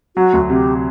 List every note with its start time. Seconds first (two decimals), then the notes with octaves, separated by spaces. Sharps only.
0.16 F#3 F#4
0.33 D2
0.50 C3 G4